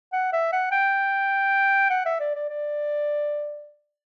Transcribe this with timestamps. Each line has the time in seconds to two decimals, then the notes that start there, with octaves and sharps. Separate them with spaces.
0.13 F#5
0.33 E5
0.53 F#5
0.72 G5
1.90 F#5
2.06 E5
2.20 D5
2.35 D5
2.49 D5